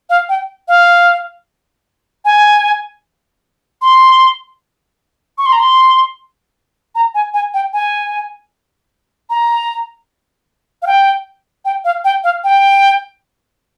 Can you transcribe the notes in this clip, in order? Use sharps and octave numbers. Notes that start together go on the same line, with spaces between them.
F5
G5
F5
G#5
C6
C#6
C6
A#5
C6
A#5
G#5
G#5
G5
G#5
A#5
F5
G5
G5
F5
G5
F5
G5